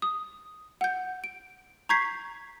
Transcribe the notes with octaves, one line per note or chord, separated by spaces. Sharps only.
D#6
F#5 G6
D7
A#5 C#6 G6 G#6 B6 C7